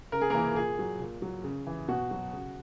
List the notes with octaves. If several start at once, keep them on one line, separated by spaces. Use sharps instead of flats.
C#3 A#4
G#4
A#3 A#4
E3
A#2 G#4
F#3
A#2
F#3
C#3
E3
B2 F#4
F#3
C#3